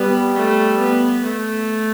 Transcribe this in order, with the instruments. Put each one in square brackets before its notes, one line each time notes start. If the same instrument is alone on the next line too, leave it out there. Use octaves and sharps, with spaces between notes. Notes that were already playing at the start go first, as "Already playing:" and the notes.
Already playing: [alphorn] G3 [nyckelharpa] B3
[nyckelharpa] A3
B3
A3